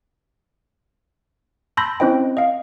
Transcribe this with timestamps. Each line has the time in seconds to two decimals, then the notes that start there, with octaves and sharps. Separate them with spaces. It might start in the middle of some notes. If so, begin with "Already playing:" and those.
1.77 A5 B5 C6 E6 G6 A#6
2.00 C4 C#4 E4 C5 D#5 G5
2.37 D#5 F5